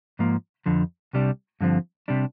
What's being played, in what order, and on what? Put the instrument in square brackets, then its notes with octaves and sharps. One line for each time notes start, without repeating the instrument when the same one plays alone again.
[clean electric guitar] G#2 F3 A#3
F2 D3 F3
C2 C3 G3 D4
G2 D3 F3 C4
C3 G3 D4